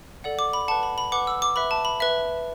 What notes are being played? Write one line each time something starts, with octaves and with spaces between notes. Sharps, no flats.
A4 D5 F#5
D6
B5
B4 F#5 A5
B5
B5
B4 F#5 D6
E6
D6
B4 E5 B5
A5
B5
B4 E5